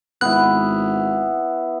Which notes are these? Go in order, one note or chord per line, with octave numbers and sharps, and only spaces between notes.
G#1 B3 E4 F#6